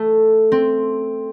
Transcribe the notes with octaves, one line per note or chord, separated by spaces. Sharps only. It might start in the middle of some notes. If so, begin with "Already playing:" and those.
Already playing: A3
C4